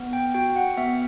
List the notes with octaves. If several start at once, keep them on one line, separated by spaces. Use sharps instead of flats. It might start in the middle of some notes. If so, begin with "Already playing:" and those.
Already playing: B3
G5
F#4 G5
F#5
B3 E5